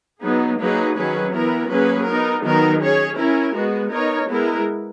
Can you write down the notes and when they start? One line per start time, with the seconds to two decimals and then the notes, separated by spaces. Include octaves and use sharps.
0.21 F#3 B3 D#4 G#4
0.59 F#3 A#3 D#4 G#4 B4
0.96 D#3 F#3 C#4 G#4 B4
1.33 E3 B3 E4 A#4
1.69 F#3 A#3 C#4 G#4 B4
2.07 B3 D#4 A#4
2.43 D#3 F#3 B3 D#4 A#4
2.81 C#4 G#4 C#5
3.17 C#4 E4 A#4
3.54 G#3 B3 F#4
3.92 B3 D#4 A#4 C#5
4.28 G#3 B3 E4 A#4